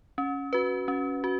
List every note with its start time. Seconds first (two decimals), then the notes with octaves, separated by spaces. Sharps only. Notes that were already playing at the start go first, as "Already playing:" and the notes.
0.18 C#4
0.53 F#4 B4
0.88 C#4
1.24 F#4